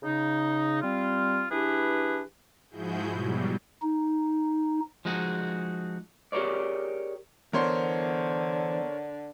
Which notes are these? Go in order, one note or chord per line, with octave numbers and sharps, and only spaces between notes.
C#3 D#4
G3 C4 F4
E3 D4 E4 G4 G#4 B4
G#2 F3 E4 F#4 G#4 G6
B2 F#3 G3
D#4
F3 G#3 D#4 F#4 G#4
G4 G#4 A#4 C#5 D5
D3 E3 B3 A#4 C5 C#5 C6